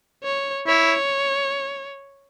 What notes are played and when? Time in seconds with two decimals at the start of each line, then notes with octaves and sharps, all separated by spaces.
0.24 C#5
0.67 E4 C#5